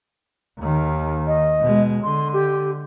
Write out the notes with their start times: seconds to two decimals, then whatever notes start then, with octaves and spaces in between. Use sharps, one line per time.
0.58 D#2 D#3
1.27 D#5
1.61 B2 G#3
2.03 D3 C6
2.33 G4